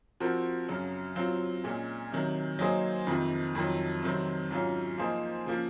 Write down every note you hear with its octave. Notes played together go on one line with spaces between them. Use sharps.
F3 C4 F#4 A#4
F#2 C#3 F#3
F#3 C4 F4
A#2 G#3 C#4
C3 D#3 F#3
F#3 A#3 D#4 G#4 C5
F2 C3 D#3
F2 D#3 F#3
C3 D#3 F#3 C4
G#2 F#3 C#4 F4
F3 A#3 D#4 G#4 C5
C#3 F3 A#3